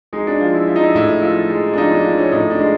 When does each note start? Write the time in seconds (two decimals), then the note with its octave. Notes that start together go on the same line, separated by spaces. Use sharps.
0.13 G#3 D#4
0.27 D4
0.40 F3
0.55 E4
0.68 F3 E4
0.76 D#4
0.83 E4
0.95 A2 E4
1.22 F3 E4
1.50 G#3
1.73 D4
1.77 F3 D#4
1.92 D4
2.04 F3 D4
2.18 C#4
2.32 A2 D#4
2.50 D4
2.59 G#3